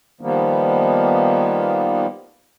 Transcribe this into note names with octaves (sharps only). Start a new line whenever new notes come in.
D#3 F3 G3 A#3 B3